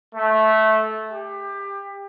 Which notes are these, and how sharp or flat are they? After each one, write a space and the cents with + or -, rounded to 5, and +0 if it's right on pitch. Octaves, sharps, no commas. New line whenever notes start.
A3 -15
G4 +25